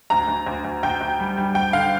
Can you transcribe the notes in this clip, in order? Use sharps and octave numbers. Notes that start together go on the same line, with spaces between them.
D2 A#5
D2
D2
D2
D2 G5
D2
G3
G3
D2 G5
D3 F5